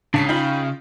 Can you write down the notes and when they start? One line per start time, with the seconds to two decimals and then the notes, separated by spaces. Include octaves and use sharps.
0.14 C#2 C#3 D4 B6 C7
0.29 D#4 F4 G5 B5